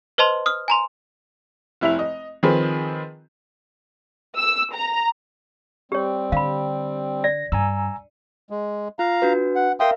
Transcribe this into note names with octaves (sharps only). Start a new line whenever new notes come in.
B4 C5 D#5 A5 C6
D#6 F6
G#5 A#5 C6
F1 E4 E5 F7
D#5
D#3 F3 C4 G#4 B4
E6
A#5
G3 C4 G4 C#5
D3 F5 B5
D5 A#6
G2 G#5 A#5 E6
G#3
F4 F5 A#5
D4 F#4 B4
F#5
A#4 E5 F5 G5 C6 D#6